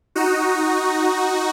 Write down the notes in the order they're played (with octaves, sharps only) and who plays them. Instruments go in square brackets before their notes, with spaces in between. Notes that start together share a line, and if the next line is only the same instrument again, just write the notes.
[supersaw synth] D#4 F#4